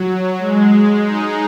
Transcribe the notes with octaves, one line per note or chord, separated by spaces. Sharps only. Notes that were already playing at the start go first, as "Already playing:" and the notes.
Already playing: F#3
G#3
G#3
D#4